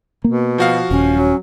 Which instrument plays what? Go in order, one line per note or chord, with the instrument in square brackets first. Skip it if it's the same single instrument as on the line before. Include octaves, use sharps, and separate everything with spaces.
[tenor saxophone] B2 [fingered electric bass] A#3
[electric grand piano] F3 F#4 F5
[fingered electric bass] D#1 [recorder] C#4
[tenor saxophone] F#3